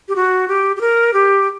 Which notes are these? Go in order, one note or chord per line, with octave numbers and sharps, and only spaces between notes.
G4
F#4
G4
G4
A#4
G4